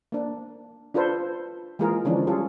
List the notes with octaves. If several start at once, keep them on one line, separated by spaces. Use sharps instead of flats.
A#3 D4
D4 F4 A4 B4 C5
E3 G#3 A#3 F4 G#4 A#4
D3 E3 F3 G#3 C#4 D4
G3 C#4 F4 G#4 A4